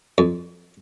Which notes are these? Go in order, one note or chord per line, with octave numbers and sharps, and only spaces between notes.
F2